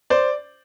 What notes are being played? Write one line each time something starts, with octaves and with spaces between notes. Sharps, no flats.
C5 D5